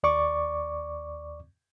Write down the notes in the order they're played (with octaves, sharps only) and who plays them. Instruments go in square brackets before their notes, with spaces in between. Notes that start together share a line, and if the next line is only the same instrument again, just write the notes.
[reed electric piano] D#2 D5 C#6 D6